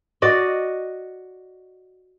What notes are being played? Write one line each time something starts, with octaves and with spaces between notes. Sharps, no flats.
F#4 D5 D#5